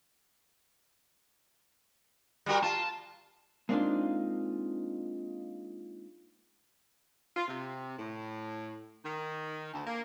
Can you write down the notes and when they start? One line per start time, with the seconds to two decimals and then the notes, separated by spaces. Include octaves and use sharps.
2.46 G3 F#4 A#4
2.63 F4 A5
3.69 G#3 A#3 C4 D4 D#4 F4
7.36 F4
7.48 C3
7.98 A2
9.05 D#3
9.73 D2
9.86 A#3